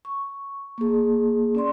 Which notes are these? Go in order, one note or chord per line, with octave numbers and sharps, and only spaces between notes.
C#6
A#3 G#4
C#4 D5 C6